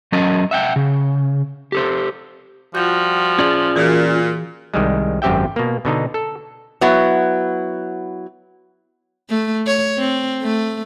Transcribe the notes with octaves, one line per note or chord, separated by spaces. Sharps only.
F#3 C#4 A#4 D#5 A5
E5 F#5 G5
C#3
G4 A4 C5
F3 G3 F4 F#4 G6
C#4 F4 G#4 D5
A#2 E3 F#4 G#4
C2 D#3 G3 G#3
G#1 F#2 C4 G4 E5 G5
B2 A#3
B2 D3 D#4
A4
F#3 B3 E4
A3
C#5
C4
A3